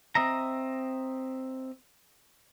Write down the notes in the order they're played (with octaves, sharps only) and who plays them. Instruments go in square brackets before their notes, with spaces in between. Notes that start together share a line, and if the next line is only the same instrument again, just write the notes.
[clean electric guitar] C4 D#5 E5 A#5